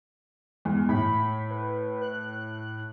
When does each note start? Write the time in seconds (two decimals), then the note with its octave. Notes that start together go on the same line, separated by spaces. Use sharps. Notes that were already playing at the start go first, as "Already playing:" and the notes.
0.65 E2 G#3
0.89 A2 B5
1.51 B4
2.02 F#6